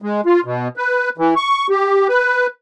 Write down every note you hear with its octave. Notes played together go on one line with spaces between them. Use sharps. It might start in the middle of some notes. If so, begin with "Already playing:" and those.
G#3
F4
B2
B4
E3
C#6
G4
B4